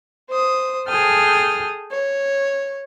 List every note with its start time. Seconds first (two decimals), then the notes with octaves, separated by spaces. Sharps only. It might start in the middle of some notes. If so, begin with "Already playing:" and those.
0.30 C5 D#6
0.88 G#4 A4 G5 D#6 F6
1.92 C#5